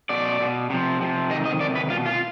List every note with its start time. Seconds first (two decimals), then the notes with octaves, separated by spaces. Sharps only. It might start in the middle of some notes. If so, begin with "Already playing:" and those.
0.09 B2 D5
0.40 B2
0.70 C3 F3
1.01 C3 F3
1.30 C3 D#3 D#5
1.45 D#5
1.60 C3 D#3 D5
1.75 B4
1.90 B2 F4
2.06 F4